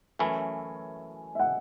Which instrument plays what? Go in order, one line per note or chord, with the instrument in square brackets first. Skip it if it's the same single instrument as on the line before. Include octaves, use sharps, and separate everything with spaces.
[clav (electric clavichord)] F#2 E3 A3 C#4 E4 [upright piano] G#5
[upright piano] E5
F#5